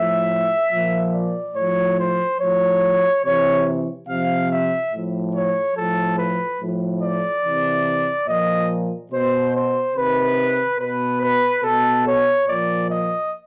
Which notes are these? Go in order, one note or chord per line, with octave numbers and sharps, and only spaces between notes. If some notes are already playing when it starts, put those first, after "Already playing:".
Already playing: A2 F3 E5
A#2 F3
D5
A2 F3 C#5
C5
A2 F3 C#5
C3 E3 C#5
C3 F3 F5
E5
A2 F3
C#5
A2 F3 A4
B4
A2 F3
D5
C3 E3
A#2 F3 D#5
B2 C5
C5
C3 D#3 B4
B2 B4
B4
B2 A4
C#5
A#2 F3 D5
D#5